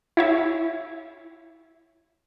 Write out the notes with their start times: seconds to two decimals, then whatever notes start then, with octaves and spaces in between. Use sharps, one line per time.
0.17 E4 C#5 E5